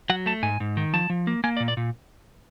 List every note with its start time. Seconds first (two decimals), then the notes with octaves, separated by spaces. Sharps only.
0.10 F#3 F#5
0.26 A3 A5
0.43 G#2 G#5
0.60 G#2
0.77 D#3
0.93 F3 A5
1.10 F3
1.27 A#3
1.44 A#3 G#5
1.57 D5
1.60 A#2
1.68 D5
1.77 A#2